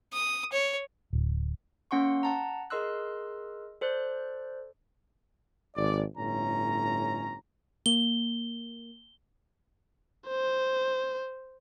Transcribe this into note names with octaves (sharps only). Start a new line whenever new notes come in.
D#6
C#5
D1
A#3 C#4 F#5 C6 C#6
F#5 A5 A#5
G#4 A#4 D#5 C6 E6 F#6
A4 C5 D5 F#6
G#1 D5
G1 A2 C#4 A#5
A#3 G7
C5